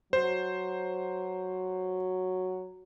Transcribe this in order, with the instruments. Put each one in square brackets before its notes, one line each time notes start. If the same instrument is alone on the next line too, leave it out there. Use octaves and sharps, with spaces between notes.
[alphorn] F#3 [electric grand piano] C5